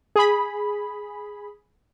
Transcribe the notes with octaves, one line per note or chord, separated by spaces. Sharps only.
G#4 B5